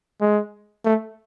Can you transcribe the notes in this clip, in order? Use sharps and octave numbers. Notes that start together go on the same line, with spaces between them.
G#3
A3